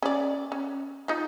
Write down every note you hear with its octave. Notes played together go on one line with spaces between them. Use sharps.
C#4 D5
C#4
D#4 F4